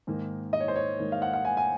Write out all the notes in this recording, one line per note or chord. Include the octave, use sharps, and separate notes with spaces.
G#2 D#3 A#3
D#5
C#5
C5
C#5
G#2 D#3 A#3
F5
F#5
F#5
G#5
G#5